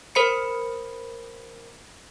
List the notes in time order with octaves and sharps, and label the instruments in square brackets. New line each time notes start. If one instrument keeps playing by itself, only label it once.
[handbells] A#4 C5 B5 C#7